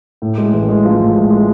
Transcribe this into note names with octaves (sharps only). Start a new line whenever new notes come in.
A2
G#3
A1
G#3
F3
A2
G#3
G#3